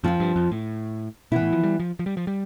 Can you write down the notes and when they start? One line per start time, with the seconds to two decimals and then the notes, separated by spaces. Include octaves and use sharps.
0.04 F2 F3 C4 F4
0.20 G2
0.36 F2
0.52 A2
1.32 B2 E3 B3 E4
1.42 A2
1.53 F3
1.63 G3
1.80 F3
1.99 F3
2.06 G3
2.17 F3
2.27 G3